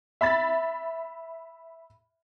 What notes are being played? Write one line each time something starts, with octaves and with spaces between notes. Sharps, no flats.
E5 B5 A6